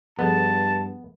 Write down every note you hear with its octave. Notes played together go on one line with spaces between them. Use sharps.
G2 F3 B3 G#4 A4 A5